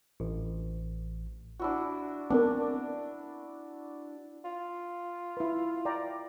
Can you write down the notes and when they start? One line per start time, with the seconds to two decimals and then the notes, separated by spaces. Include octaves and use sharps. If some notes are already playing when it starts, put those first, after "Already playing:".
0.20 A1
1.60 D4 E4 F#4
2.30 B3 C4 D4 A#4
4.44 F4
5.37 E4 B4
5.85 D5 G5 A#5